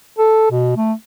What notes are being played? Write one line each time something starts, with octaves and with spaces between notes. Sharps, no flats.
A4
B2
A3